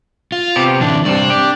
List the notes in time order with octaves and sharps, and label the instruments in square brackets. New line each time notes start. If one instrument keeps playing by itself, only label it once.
[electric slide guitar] F4
[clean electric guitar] C3 B3 G4
[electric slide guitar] A2 D3 E3 [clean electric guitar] D4
[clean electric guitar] C2 G2 C3 [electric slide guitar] D4
[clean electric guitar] G4